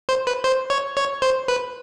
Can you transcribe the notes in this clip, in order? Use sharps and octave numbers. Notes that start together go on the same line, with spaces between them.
C5
B4
C5
C#5
C#5
C5
B4